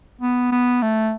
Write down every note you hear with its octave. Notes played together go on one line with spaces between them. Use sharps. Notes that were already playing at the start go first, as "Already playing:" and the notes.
B3
B3
A3